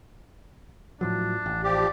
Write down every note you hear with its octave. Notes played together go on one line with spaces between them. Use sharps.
A2 F3 F#3 D4
A1
F3 G4 D5